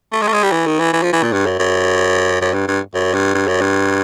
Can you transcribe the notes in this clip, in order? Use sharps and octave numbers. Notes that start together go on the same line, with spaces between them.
A3
G#3
A3
G#3
G3
E3
D#3
E3
E3
F3
E3
A#2
G2
F#2
F#2
F#2
G2
G2
F#2
G2
G2
F#2
G2